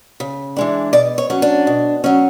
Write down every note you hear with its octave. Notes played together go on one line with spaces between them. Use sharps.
C#3
E3 G#3 D4
B2 D5
C#5
F#3 C#4
D4
B2
F#3 C#4